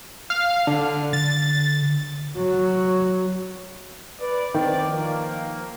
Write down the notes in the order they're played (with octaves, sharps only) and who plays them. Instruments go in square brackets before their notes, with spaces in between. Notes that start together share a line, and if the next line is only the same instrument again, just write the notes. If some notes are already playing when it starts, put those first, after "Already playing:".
[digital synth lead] F5
D3
[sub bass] D3 [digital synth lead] A6
[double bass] F#3
[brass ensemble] B4 D5
[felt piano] D#3 [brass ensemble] C4 B4 D5
[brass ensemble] F3 A#3